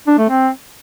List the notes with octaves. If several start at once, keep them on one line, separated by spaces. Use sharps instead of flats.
D4
A3
C4